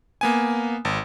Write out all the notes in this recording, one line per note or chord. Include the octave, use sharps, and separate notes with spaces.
A#3 B3 G#5
G#1